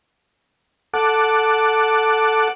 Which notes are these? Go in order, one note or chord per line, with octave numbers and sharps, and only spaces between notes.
A4 F#5 D6